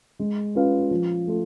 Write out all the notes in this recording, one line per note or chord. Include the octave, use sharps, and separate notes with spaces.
G#3
C#4 F4 B4 F5
F3
A3 F4